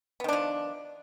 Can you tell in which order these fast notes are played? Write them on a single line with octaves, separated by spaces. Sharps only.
B3 D#3 D4 F3